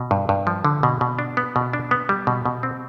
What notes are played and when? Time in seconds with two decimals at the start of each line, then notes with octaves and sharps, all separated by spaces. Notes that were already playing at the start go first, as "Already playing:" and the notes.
Already playing: B2
0.11 G2
0.29 G2
0.47 F3
0.65 D3
0.83 B2
1.01 B2
1.19 D4
1.37 B3
1.56 B2
1.73 D4
1.91 B3
2.09 G3
2.27 B2
2.45 B2
2.63 C4